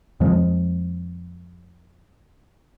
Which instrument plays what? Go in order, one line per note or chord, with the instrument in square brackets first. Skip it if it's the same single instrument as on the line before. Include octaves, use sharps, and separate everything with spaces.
[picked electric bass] F2 F3 G#3